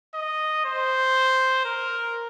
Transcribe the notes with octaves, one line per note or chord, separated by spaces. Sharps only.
D#5
C5
A#4